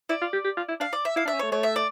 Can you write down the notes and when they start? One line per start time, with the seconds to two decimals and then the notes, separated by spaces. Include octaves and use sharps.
0.09 E4 D5
0.21 F4
0.33 G4
0.45 G4
0.57 F4
0.69 E4
0.80 D4 F5
0.93 D5
1.05 E5
1.16 E4 F5
1.25 D4 E5
1.33 C#4
1.39 A3 C#5
1.52 A3 C#5
1.63 E5
1.76 D5